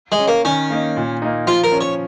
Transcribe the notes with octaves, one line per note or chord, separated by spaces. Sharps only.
G#3
C#4
A#3
D#3 C#4
A#3 D#4
A#2
A#3 D#4
F3 F4
A#4
C#4
C#5